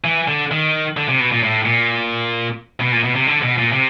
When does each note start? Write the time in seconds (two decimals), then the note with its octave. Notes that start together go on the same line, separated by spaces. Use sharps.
0.04 E3
0.28 D3
0.51 D#3
0.97 D3
1.09 C3
1.20 B2
1.32 A#2
1.44 A2
1.66 A#2
2.81 B2
2.92 A#2
3.04 B2
3.16 C3
3.27 D3
3.43 B2
3.58 A#2
3.73 C3